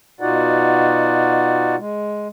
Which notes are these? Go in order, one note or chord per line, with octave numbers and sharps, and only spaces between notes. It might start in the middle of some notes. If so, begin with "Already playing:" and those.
B2 D#4 F4 F#4 D5 F#5
G#3